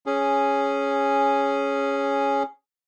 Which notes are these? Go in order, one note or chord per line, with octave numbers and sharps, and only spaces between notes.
C#4 G#4